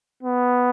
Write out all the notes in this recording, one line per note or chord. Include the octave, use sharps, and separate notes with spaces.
B3